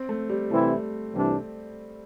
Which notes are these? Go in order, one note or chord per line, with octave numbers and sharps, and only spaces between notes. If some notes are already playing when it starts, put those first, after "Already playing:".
Already playing: C4
A3
G3
C3 E3 A3 C4 E4
C2 C3 E3 G3 D4